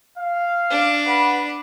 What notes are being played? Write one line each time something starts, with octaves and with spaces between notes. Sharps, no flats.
F5
D4
B4 F#5 B5